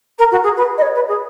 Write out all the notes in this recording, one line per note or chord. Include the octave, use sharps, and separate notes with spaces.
A#4
F#4
G#4
B4
D#5
C#5
B4
G#4